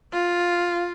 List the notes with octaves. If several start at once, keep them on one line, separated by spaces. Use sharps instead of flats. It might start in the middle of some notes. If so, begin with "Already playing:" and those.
F4